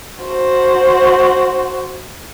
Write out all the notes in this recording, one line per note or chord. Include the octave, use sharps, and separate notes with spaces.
F#4 C5